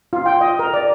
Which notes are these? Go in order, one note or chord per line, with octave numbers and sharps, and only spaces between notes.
F4
G5
D#5
A#4
D5